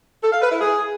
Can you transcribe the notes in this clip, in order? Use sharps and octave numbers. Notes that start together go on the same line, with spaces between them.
A4
F5
B4
E4
G#4